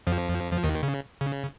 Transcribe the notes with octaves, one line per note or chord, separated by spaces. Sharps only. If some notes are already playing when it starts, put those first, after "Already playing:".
F2 F3
F3
D#2 D#3
C#3
C#3